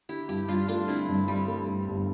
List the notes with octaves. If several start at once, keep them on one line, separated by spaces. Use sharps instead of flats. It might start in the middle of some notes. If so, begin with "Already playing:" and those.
D3 E4 G4
G2 E4 G4
G2 D4 F4
A3 D4 F4
D3 C4 E4
G2
G2 G3
A3
G2
G1